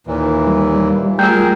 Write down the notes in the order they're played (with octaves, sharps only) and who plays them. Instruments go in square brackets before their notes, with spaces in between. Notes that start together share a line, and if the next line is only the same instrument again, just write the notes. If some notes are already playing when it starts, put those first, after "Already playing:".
[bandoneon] D#2 A#2 E3
[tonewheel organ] G3
[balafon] A3 F4 [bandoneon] G#4 A#4